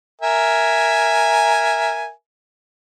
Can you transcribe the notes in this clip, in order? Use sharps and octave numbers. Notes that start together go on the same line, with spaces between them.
A#4 E5 G#5